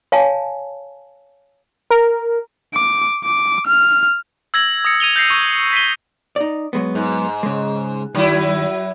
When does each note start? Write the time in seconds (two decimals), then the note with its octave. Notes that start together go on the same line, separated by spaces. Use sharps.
0.12 C#5 F5 G#5 A5
1.90 A#4
2.74 D6
3.24 D6
3.67 F6
4.54 E6 G#6 A#6 F#7
4.85 D#6 A#6 C#7
5.00 G#6 D#7 F7 G7
5.16 G6 A#6 C7 C#7
5.30 C#6
5.73 B6 C7 D#7 G7
6.36 D#4 D5
6.73 F#3 G#3 B3
6.95 G#2
7.43 C#3 G#3
8.15 G2 D#3 F#3 E4